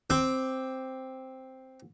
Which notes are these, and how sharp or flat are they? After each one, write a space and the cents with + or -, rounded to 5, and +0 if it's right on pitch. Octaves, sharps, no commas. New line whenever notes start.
C4 +0 D6 +0